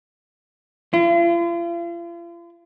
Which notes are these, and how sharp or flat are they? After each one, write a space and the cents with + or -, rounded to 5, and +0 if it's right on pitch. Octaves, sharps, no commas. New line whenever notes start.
F4 -40